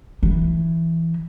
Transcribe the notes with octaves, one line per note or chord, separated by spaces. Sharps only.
E3